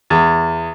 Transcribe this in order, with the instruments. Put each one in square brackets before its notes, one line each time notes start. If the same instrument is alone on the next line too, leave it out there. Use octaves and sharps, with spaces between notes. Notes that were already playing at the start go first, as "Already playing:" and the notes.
[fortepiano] E2